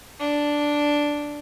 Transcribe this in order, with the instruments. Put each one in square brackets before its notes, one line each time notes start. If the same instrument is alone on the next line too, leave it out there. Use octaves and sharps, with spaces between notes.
[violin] D4